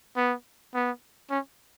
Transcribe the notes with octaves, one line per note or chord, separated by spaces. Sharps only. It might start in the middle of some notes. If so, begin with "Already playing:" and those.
B3
B3
C#4